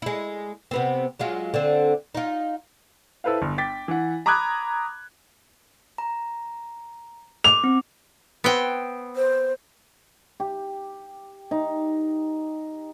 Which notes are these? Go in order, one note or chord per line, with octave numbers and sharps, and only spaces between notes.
G#3 E4
C3 B3 C4
F#3 G#3 F4
D3 C4
D#4 F4
E4 A4 B4 C5 F5
G1
G5 D6 A6 B6
E3 F#5
A#5 B5 D6 D#6 F#6 G#6
A#5
D6 F7
C4
B3 C4 G5
C5
G4
D#4